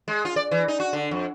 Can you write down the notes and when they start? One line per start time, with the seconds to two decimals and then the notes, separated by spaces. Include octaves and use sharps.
0.08 G#3
0.25 F4
0.36 D5
0.51 E3
0.68 D#4
0.80 F#4
0.93 D3
1.11 F2